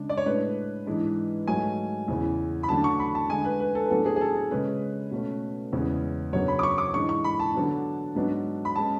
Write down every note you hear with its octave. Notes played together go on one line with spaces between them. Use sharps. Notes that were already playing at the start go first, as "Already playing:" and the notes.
Already playing: C#3 G#3 D4
D5
C#5
A2 G#3 D4 B4
G#2 E3 G#3 D4
G#2 F#3 A3 G#5
E2 C#3 E3
B5
D3 F#3 A3 D4 A5
C#6
B5
A5
D3 G#3 D4 G#5
B4
B4
A4
B4
A2 F#3 B3 D4 A4
G#4
G#4
A4
A4
C#3 G#3 C#4 B4
B2 A3 C#4
E2 C#3 G#3 C#4
F#2 C#3 F#3 B3 D4 C#5
B5
D6
C#6
D6
G#2 E3 G#3 D4 C#6
C#6
B5
A5
D3 F#3 B3 D4
G#2 F#3 B3 D4
B5
G#3 C#4 A5